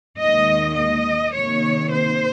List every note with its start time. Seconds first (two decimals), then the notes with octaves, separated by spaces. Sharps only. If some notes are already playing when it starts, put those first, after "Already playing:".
0.19 D#2 D#3 G#3 D#5
0.77 D#5
1.34 C3 D#3 A#3 C#5
1.92 C5